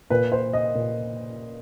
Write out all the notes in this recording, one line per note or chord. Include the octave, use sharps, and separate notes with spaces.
A#2 B4
C5
D#5
A#2